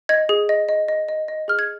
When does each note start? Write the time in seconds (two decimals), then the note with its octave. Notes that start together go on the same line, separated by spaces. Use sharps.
0.09 D#5 G#6
0.29 G#4
0.49 D#5
0.69 D#5
0.88 D#5
1.09 D#5
1.28 D#5
1.48 G#4 F6
1.59 G#6